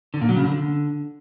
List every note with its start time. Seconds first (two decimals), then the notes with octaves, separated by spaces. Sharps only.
0.14 D3
0.21 A#2
0.29 F#3
0.36 C#3
0.44 D3